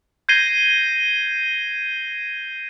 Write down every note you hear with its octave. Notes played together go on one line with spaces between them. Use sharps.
G6 G#6 A#6 C7 D#7 G7